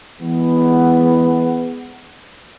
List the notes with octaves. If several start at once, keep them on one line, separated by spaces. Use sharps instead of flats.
E3 G#3 B3